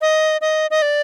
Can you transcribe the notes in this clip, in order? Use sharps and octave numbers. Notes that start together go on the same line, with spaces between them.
D#5
D#5
D#5
D5